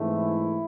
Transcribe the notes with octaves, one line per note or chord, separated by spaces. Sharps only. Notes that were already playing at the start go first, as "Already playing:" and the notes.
Already playing: G#2 E3 A3 C4
E4